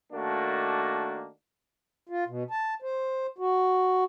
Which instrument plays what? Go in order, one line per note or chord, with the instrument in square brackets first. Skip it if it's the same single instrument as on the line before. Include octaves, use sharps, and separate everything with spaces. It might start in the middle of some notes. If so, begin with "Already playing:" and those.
[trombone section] D#3 A3 A#3 D4 F#4
[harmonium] F4
B2
A5
C5
F#4